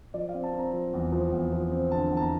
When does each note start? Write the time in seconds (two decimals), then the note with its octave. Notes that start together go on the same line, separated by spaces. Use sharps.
0.14 F3 D5
0.29 F5
0.34 C4
0.44 A5
0.54 C4 A#5
0.73 F3
0.94 E2
1.12 F3
1.32 E2
1.52 F3
1.72 C4
1.92 D3 A5
2.11 E2
2.17 A5
2.21 A#5